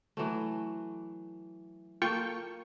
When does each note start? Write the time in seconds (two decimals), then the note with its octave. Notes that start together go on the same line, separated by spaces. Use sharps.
0.17 E3 F#3 A3
2.02 A#3 F4 A4 G5 C#6